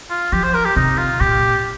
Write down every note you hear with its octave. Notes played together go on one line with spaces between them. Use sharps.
F4
F3 G4
C5
A#4
G4
C3 D#4
F4
A#2 G4